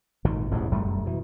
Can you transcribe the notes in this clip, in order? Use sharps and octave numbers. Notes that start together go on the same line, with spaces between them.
G#1 A#2 D#3
E1 A1 E2 G#2
F1 F#2 G3 A3
B2 E3